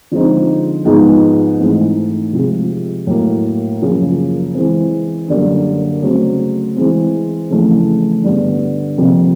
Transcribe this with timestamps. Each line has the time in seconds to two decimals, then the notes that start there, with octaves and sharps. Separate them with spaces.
0.11 D3 F3 G#3 C4 D#4
0.85 G#2 F3 G#3 B3 D#4
1.59 G#2 E3 A3 C4
2.33 C3 F3 G#3
3.07 A2 F#3 A#3
3.81 F#2 C#3 F3 A#3
4.54 E3 G#3 C4
5.28 F#2 D3 G3 A#3
6.03 C#3 F#3 A3 C4
6.76 E3 G#3 C4
7.50 F2 C#3 E3 A3
8.24 G2 D3 G3 B3
8.98 F2 C3 F3 A#3